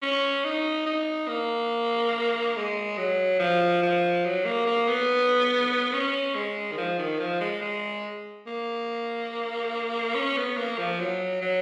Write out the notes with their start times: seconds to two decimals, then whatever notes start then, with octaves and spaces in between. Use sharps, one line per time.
0.02 C#4
0.44 D#4
0.86 D#4
1.28 A#3
2.56 G#3
2.97 F#3
3.40 F3
3.82 F3
4.25 F#3
4.45 A#3
4.67 A#3
4.88 B3
5.93 C#4
6.35 G#3
6.71 D#3
6.78 F3
6.99 D#3
7.19 F3
7.40 G#3
7.61 G#3
8.46 A#3
10.15 C#4
10.36 B3
10.57 A#3
10.78 F3
11.00 F#3
11.41 F#3